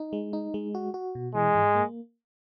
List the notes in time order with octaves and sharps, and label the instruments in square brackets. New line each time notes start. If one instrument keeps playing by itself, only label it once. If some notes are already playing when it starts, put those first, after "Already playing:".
Already playing: [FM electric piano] D#4
G#3
D#4
G#3
F#4
F#4
B2
[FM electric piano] E3 [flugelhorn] G#3
[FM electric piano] G#2
A#3